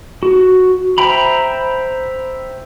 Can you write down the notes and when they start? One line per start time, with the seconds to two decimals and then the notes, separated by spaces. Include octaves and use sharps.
0.23 F#4
0.98 C5 E5 G5 A#5 B5